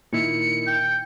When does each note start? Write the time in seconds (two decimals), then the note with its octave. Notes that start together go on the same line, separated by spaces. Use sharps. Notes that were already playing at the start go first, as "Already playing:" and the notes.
0.13 A#2 D#3 E4 C#7
0.67 G5